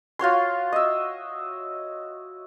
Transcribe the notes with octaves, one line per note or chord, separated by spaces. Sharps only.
F4 F#4 C#5 C6
D#5 E5